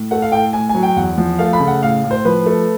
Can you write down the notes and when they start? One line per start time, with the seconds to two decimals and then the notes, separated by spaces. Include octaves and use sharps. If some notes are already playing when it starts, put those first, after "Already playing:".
Already playing: A2
0.11 A3 F#5
0.22 F5
0.32 A2 G5
0.53 A2 G#5
0.69 G#5
0.75 F#3
0.83 G5
0.96 E2 F#5
1.18 F3
1.39 A3 F5
1.53 B5
1.60 C#3
1.68 F#5
1.82 A2 F5
2.04 A2
2.11 C5
2.25 F3 B4
2.46 A3